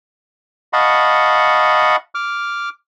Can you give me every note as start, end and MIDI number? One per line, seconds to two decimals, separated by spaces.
0.73 1.96 75
0.73 1.96 77
0.73 1.96 78
0.73 1.96 81
0.73 1.96 83
0.73 1.96 85
2.15 2.69 86
2.15 2.69 89